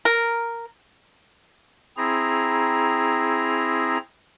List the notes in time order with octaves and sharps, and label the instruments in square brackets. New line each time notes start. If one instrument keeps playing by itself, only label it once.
[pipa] A#4
[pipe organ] C4 E4 G#4 A#5